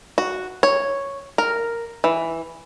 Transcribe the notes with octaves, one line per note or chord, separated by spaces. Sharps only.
F#4
C#5
A#4
E3